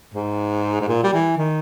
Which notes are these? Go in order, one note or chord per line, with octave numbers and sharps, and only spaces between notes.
G#2
G#2
A#2
G3
E3
D#3